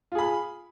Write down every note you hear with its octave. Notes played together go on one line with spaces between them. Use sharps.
F4 G#4 B5